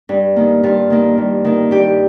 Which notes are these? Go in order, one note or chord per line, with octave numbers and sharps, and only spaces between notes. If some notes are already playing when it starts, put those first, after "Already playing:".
G2
D#3 A#3
G2 F4
D#3 A#3
G2
D#3 A#3
G2 G4